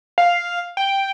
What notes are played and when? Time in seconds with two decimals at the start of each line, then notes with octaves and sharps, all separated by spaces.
0.18 F5
0.77 G5